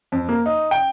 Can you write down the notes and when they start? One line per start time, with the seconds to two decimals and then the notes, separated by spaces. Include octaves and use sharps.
0.12 F2
0.29 A#3
0.46 D#4
0.71 G5